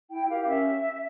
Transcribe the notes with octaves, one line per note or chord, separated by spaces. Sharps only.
E4 G5
G4 A#4 F5
C#4 E5